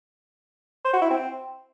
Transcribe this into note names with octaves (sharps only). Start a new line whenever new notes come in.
C5
F#4
E4
C4